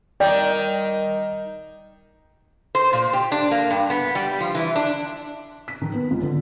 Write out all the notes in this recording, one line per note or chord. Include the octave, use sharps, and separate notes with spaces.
D#3 G3 A#4 D5 G5
C5
A#2
G4
D4
A#3
G2
B3
G3
F3
E3
D4
B6
D#3
B3
C#2
D3